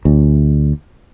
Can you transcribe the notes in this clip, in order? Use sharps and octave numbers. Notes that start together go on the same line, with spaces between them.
D2